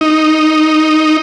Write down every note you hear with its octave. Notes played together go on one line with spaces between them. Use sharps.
D#4